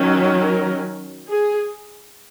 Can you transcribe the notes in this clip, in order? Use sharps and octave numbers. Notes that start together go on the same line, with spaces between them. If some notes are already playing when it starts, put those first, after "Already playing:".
Already playing: D#3 F#3 C#4
A#4
G#4